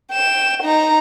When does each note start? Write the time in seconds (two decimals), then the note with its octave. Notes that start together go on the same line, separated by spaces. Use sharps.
0.12 G5 E7
0.63 D#4 A#5